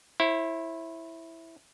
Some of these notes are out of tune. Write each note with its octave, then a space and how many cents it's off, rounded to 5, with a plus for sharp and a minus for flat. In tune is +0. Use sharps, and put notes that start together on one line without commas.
E4 +0 C5 +45